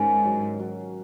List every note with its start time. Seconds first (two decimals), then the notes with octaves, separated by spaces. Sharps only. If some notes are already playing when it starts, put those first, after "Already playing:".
Already playing: G#2 D#3 C#4
0.25 F#3
0.60 F#3